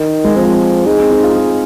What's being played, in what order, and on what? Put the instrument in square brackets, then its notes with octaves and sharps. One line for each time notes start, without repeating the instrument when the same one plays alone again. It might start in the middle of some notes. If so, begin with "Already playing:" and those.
Already playing: [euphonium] D#3
[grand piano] G#3
[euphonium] F3 [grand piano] C4
[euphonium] G#3 [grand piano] D#4
[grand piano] C4
D#4
F4
G#4